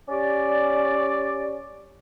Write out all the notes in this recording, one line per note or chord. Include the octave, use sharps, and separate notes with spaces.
C#4 G4 D5